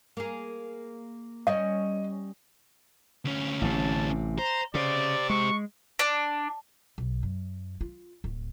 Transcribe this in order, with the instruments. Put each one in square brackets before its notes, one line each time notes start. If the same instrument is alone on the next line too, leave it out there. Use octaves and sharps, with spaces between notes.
[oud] A#3 G#4
[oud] G3 C#4 [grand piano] D#5
[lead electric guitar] D2 C#4
[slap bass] A1 C3 [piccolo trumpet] A5
[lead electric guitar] C5 [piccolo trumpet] A#5
[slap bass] C#3 [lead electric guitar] G4 C5 [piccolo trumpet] D5
[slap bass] G#3 [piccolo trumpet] C#6
[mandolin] D4
[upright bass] B1
F#2
F4
D1